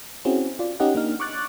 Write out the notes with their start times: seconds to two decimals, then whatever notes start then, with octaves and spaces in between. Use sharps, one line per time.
0.25 C4 C#4 E4 F#4 G#4
0.59 F4 D5
0.80 C#4 D#4 G4 D#5 F#5
0.95 A#3 D4 D#4 F6
1.20 C#6 D6 F#6 A6